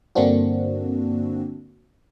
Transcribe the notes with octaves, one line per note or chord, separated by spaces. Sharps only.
G2 D3 A#3 C4 D4 F#4